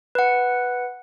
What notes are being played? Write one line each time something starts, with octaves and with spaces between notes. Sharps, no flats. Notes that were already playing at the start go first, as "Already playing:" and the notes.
B4 F#5